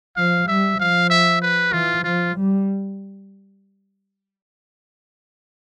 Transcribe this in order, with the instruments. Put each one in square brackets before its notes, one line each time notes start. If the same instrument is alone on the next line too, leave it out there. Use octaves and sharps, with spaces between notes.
[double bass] F3 [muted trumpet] F5
[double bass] G3 [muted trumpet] E5
[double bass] F3 [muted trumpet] F5
[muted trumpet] E5
B4
[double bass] E3 [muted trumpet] F4
[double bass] F3 [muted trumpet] F4
[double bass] G3